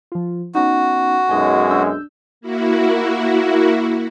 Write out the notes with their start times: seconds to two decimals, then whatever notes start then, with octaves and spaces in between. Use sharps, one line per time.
0.12 F3 F4
0.55 B3 C#4 D#4 F#4
1.29 B1 F#2 G#3 D#4 D#5 G#5
1.70 D4 E6 G6
2.41 A#3 E4 F#4